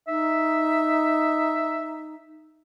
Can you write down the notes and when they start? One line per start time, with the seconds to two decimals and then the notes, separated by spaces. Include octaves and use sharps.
0.08 D#4 E5